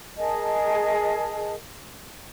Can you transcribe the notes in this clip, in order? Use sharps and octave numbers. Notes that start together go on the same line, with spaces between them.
G#4 A#4 D#5 A5